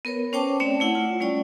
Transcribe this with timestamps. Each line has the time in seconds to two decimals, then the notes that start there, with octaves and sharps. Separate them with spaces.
0.05 B3 A#4 B4 C#5
0.33 C#4 C5 C#5 G5 A5 D6
0.60 A3 C4 C#4 C#5 D5 G5
0.80 A3 E4 F#5
0.95 F4
1.20 G3 A3 C#4 D5 G5